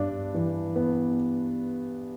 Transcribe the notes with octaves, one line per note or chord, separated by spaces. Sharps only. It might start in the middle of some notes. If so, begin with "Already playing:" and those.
Already playing: G2 D4
E3
B3